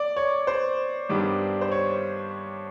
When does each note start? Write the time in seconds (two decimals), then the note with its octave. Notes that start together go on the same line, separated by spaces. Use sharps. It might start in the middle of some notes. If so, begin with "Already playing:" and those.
Already playing: D5
0.17 C#5
0.47 C5
1.09 G2 D#3 G3 B3 D4
1.61 C5
1.72 C#5